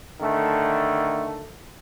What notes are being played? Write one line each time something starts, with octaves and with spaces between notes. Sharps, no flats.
D3 D#3 A3